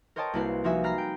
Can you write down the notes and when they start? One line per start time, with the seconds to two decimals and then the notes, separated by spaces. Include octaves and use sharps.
0.16 A#4 C5 C#5 D#5 G5 A5
0.33 C2 A#3 E4 F#4 B4 C7
0.64 F3 D#4 F#4 A#4 E5 G#5
0.84 A#5 B5 F6 F#6 A#6 C7
0.98 G5